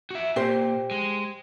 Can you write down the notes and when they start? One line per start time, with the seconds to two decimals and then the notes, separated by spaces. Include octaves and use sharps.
0.11 F#4 E5
0.36 A#2 G4 C5
0.91 G#3